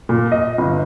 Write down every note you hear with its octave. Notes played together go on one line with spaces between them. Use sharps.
A#2
D#5
G1